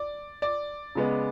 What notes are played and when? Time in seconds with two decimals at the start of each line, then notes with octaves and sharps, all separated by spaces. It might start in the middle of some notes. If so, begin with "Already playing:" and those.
Already playing: D5
0.42 D5
0.95 C#3 G#3 B3